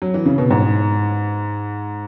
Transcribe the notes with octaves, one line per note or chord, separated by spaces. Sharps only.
F#3
E3
C#3
B2
G#2